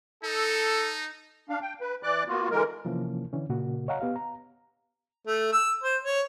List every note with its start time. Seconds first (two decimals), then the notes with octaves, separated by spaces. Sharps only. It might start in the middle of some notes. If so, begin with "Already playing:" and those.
0.24 D#4 A4
1.49 D4 F5
1.62 G5
1.81 B4
2.03 E3 D5 D6 F#6
2.28 A#3 B3 F4 F#4
2.51 D3 E3 G#3 A#4
2.85 C3 E3 F3 A#3 C#4
3.33 D3 E3 C#4
3.49 A#2 C#3 A#3 F#4
3.88 C#5 D#5 F5 F#5 A#5
4.01 B3 G4 F5
4.16 A#5
5.27 A3
5.52 E6
5.84 C5
6.04 C#5